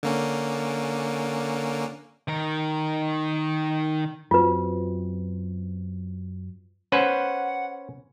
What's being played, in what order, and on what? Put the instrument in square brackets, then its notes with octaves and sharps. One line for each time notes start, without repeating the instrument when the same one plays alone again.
[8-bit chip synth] D3 A#3 C#4
[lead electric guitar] D#3 A#4
[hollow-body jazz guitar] F#2 C4 [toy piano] F4 B4
[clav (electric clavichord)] C#4 B4 C5 [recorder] F#5